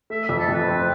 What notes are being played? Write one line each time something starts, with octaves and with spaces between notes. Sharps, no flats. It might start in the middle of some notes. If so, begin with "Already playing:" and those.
A3 E5
F2 E5
A4
F2 B4
C4